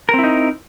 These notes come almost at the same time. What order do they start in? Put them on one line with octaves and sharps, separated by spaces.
A#4 C4 E4 D#4